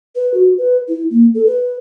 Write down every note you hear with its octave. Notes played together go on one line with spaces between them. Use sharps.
B4
F#4
B4
E4
A#3
A4
B4